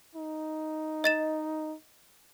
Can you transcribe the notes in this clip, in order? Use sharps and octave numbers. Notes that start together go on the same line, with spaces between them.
D#4
D#5 A6 E7